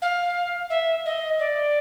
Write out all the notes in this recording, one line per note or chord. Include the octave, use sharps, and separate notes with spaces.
F5
E5
D#5
D5